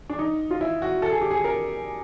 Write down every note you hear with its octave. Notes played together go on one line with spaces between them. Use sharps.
D4
D#4
F4
E4
F#4
A4
G#4
G4
G#4
A#4